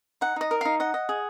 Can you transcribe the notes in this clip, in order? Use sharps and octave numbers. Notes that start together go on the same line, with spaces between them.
D#4 F#5
D#4 D#5
A#4
D#4 F5
D#5 F#5
D#5
G#4